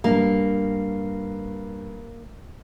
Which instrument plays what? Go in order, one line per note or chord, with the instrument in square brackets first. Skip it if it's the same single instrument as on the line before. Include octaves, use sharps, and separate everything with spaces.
[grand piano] G2 [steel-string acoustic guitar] A#3